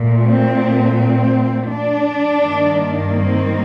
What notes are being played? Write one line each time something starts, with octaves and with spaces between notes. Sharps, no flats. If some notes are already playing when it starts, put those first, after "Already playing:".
Already playing: A#2 A3
C4
C4
D4
G2 D#3 A#3
C4